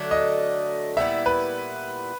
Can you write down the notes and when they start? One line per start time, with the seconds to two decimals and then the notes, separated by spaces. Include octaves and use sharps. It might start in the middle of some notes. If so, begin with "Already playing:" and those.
Already playing: D3 F#3 A3 D4
0.11 D#5
0.97 A#2 G3 B3 E4 E5
1.26 B4